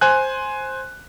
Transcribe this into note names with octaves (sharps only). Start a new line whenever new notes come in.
C5 G#5 F#6